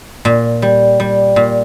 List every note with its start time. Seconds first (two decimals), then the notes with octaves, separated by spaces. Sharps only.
0.25 A#2
0.62 G3
1.00 G3
1.36 A#2